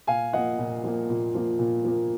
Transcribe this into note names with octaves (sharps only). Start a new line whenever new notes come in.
A#2 F5 G#5
F3 A#3 D#5 F#5
A#2
F3 A#3
A#2
F3 A#3
A#2
F3 A#3